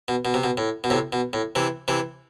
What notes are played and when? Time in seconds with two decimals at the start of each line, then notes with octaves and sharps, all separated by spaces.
0.08 B2
0.25 B2
0.34 C3
0.44 B2
0.57 A2
0.84 B2
0.90 A2 C3
1.13 B2
1.33 A2
1.55 C3 E3
1.88 C3 E3